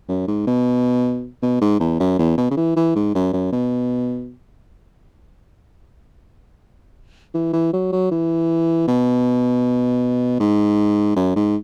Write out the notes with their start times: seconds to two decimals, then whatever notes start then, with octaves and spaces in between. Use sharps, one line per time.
0.09 F#2
0.28 G#2
0.47 B2
1.42 B2
1.62 G#2
1.80 E2
2.00 F#2
2.19 E2
2.38 B2
2.51 C#3
2.57 E3
2.76 E3
2.96 G#2
3.15 F#2
3.33 F#2
3.53 B2
7.35 E3
7.53 E3
7.73 F#3
7.93 F#3
8.12 E3
8.88 B2
10.40 G#2
11.17 F#2
11.36 G#2